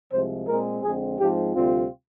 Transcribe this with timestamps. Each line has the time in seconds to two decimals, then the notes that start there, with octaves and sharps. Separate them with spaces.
0.13 C2 C3 F3 G#3 C5
0.48 A#2 G#3 C4 A#4
0.83 F2 D3 G#3 C4 G#4
1.19 G#2 F3 G#3 C4 G4
1.54 D2 C3 G3 C4 F4